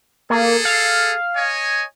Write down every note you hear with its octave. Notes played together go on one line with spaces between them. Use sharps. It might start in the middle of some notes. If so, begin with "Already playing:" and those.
A#3 G#4 A4
F5
C#5 D#5 G#5